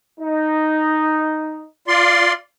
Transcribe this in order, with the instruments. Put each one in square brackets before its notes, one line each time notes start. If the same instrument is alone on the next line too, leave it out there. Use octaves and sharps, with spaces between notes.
[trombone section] D#4
[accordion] F4 D5 C6